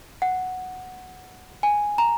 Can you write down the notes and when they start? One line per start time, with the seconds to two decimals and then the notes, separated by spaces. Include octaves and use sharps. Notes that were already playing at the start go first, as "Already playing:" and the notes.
0.22 F#5
1.63 G#5
1.98 A#5